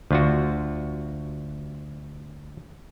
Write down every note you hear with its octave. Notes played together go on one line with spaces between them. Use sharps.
D2 F4 F#4